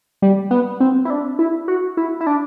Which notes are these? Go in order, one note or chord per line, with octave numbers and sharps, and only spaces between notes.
G3
B3
C4
E4
D4
E4
F#4
E4
E4
D4